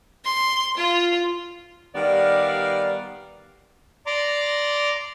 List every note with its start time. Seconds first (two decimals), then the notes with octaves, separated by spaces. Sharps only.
0.24 C6
0.77 F4
1.95 D#3 G3 B3 D5 F5
4.06 D5 A#5 C6 D6